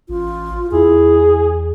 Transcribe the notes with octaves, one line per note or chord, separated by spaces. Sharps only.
A1 F4
E2 E4 G#4